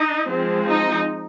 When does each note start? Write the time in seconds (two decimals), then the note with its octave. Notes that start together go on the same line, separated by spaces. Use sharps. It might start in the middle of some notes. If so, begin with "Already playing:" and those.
Already playing: D#4
0.27 F3 G#3 C4
0.67 D#4